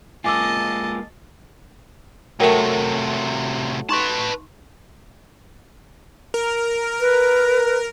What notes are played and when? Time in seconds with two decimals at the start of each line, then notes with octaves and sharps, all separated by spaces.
0.24 G#3 A#3 F4 D#5 G#5 A5 D6 E6
2.40 A2 C3 F#3 A3 A#4 G5
3.89 D#4 B4 A5 C6 C#6
6.34 A#4
7.01 B4